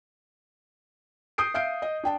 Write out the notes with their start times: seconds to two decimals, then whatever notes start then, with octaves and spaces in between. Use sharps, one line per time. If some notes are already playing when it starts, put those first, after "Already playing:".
1.38 D#6 G6 C7 D7
1.54 E5 F5 G6 C7 D7
1.82 D#5
2.03 D4 G5 A5